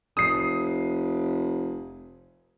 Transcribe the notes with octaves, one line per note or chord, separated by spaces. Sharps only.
F1 D#6 C7